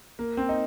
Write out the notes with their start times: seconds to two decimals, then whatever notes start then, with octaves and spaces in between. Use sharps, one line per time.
0.19 A#3
0.37 C4
0.49 D#4